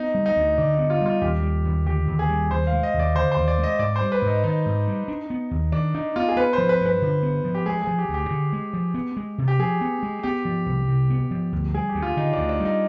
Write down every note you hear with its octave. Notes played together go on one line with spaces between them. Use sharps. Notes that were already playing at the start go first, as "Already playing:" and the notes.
Already playing: B3 D#4
G3
D#4
D2
D3 D4
B3 D#4
F4
G3 F4
D#2 G4
G3
D#2
D3 G4
D#2
G#4
G3
D#2 C5
F5
G#3
D#5
D#2
D5
D3 C5
D#2 C5
D5
G#3
D#5
G#2 D5
C5
G3
B4
G#2
D#4
D#3 D#4
G#2
G3
D4
B3
D#2
D#3 D4
D4 D#4
B3 F4
G#4
B3 B4
C5
F3
B4
G2
B4
D3
B3
F3
G4
G#3 G#4
G#4
F3
G4
D2
G4
D3
G#3
F3
B3
G#3
C3
G4
F3 G#4
B3
G#3
B3 G4
F3
C2
C3
B3
F3
D2
G3 G#4
G4
D2
F4
D3 D#4
D2 D4
D4
G3 D#4